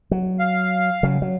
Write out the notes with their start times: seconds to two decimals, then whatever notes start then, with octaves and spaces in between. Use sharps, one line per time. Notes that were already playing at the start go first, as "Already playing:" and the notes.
0.11 F#3
0.40 F5
1.03 C#3 F#3
1.22 F#3